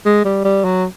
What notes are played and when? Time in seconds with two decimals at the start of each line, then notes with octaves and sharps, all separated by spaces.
0.06 G#3
0.25 G3
0.44 G3
0.65 F#3